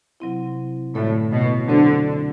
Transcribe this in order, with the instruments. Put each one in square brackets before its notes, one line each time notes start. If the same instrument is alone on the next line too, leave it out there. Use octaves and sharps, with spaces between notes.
[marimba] C3 F#3 C4 E4
[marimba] F#2 D3 A3 E4 A4 [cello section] A2
[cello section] B2
[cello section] D3 [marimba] F#3 C4 F#4 C5